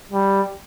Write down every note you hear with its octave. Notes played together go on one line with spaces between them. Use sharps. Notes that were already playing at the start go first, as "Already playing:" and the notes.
G3